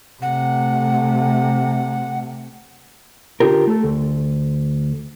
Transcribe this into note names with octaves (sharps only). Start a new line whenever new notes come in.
C3 A3 F#5
D3 F4 G4 A#4
A3 A4
D2